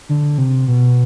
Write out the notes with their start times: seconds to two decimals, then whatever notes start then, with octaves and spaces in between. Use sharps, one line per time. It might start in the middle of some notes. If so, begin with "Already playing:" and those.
0.09 D3
0.38 C3
0.68 B2